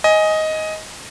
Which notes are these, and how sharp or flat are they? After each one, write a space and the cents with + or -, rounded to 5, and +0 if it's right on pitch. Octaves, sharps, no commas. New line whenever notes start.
D#5 +10 G#5 +0